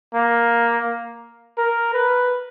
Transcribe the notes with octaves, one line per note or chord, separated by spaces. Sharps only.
A#3
A#4
B4